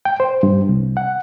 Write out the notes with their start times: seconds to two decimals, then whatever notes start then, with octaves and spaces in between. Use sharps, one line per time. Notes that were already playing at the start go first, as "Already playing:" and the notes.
0.05 G5
0.20 C5
0.43 G2
0.69 C2
0.97 F#5